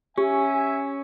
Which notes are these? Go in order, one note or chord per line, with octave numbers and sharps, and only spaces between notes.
C#4 G4 E5 G#5